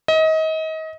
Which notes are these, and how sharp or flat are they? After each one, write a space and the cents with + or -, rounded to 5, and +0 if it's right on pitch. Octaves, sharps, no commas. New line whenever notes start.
D#5 +30